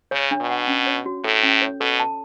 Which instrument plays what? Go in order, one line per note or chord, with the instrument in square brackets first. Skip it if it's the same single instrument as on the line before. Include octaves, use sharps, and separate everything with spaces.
[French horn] C#3 [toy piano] C#5
[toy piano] D4
[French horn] B2
[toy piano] F#5
C#4
C#5
F#4
[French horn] A2 [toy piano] A4
[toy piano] C#4
C#5
[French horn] B2 [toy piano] A4
[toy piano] A5